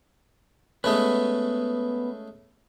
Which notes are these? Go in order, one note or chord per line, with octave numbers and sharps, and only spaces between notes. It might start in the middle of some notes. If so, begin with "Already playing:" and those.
G#3 A3 B3 C#4 B4